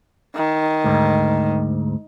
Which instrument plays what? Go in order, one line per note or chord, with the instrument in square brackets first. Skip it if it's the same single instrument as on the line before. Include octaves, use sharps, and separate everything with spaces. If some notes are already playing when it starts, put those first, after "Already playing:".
[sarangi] D#3
[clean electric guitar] D2 G#2